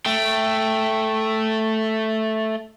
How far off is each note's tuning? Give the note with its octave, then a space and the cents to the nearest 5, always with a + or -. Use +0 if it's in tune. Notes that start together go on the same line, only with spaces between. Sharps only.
A3 +0 G5 +0